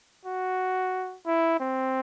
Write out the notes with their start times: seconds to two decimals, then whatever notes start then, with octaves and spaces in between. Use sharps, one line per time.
0.25 F#4
1.26 E4
1.60 C4